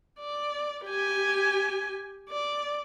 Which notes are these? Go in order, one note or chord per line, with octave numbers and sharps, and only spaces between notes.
D5
G4 G#5
D5